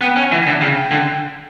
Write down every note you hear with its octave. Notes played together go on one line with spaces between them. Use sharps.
B3 G5
C#4
F#5
E3
G5
D3
C#3
D3